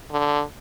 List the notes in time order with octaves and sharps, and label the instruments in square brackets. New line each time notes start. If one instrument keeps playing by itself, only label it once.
[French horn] D3